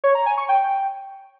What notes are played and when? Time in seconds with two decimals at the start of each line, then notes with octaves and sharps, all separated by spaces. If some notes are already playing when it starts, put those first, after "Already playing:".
0.04 C#5
0.15 A#5
0.26 G#5
0.37 C#6
0.49 G5